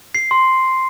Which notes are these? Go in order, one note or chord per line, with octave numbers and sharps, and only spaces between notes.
C7
C6